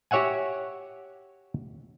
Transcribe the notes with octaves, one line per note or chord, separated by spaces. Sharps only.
F#4 G4 C#5 E5 F#5 G#5